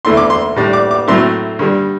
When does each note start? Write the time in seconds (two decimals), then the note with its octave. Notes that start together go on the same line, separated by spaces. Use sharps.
0.05 E2 D3 A3 E4 C6
0.17 D6
0.30 C6
0.56 A2 G3 D4
0.73 D6
0.91 D6
1.08 A2 F#3 A3 C4 E4 C6
1.59 G2 D3 G3